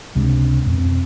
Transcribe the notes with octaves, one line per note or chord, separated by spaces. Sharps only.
C#2 C3 G#3 D4
F2 B2 A#3 C4